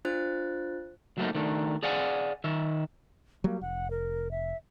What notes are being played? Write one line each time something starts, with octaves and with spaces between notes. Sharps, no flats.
D4 F4 C5 F#6 A6
F#3 A3 A#3 D#4
D#3 A3 D4
G#4 D5 F5 F#5 G#5
D#3 E5
F#3 G3 A#3
F1 F#5
A#4
E5